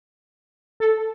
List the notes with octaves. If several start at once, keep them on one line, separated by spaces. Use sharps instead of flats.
A4